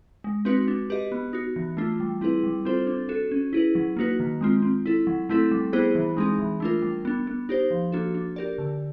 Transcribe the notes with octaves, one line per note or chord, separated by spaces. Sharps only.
G#3
C4 D#4 F#4 B4
D4
G4 B4 D#5
B3
D#4 F#4
E3
A3 D4 F4
G3
C4 E4 G#4 B4
G3
C4 F4 A4 C5
D4
F#4 A4
C#4
E4 G#4 B4
F#3
A#3 D#4 F#4 B4
D#3
G#3 C4 F4
C4
E4 A4
F#3
A3 C4 E4 A4
G3
B3 E4 G#4 C5
E3
G#3 C4 D#4 G#4
E3
A3 D4 F4 A#4
G3
B3 D4
B3
D#4 G4 C5
F3
A#3 D4 F#4 A4
D4
G4 A#4 D5
D3